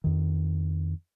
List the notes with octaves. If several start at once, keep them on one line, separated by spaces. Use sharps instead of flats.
F2 D#3